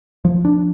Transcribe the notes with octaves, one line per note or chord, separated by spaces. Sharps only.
F3
D4